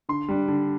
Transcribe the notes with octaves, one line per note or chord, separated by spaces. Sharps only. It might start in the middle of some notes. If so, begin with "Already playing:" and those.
D3 C6
G3 D4
D3